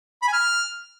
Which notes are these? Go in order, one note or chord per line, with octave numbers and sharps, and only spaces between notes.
B5
G#5
F6